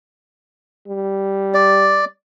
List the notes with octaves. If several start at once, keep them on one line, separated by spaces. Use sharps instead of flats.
G3
D5